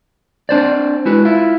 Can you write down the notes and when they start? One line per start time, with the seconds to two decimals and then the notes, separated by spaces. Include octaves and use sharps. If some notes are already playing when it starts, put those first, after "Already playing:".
0.49 C4 D4 C5 D5
1.05 G#3 E4 F#4 B4
1.25 E4 F4